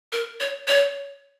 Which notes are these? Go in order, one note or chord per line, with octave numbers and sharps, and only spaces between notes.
A#4
C#5
C#5